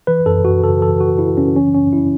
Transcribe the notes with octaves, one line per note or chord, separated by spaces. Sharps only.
E3 B4
F#2 A4
F#2 F#4
C#3 A4
E3 A4
F#2 F#4
F#2 E4
C#3 C#4
E3 C#4
F#2 C#4
E4